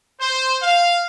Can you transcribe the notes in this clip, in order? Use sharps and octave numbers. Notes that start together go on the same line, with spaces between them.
C5
F5